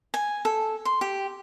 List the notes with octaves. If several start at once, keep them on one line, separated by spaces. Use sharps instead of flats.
G#5
A4
C6
G4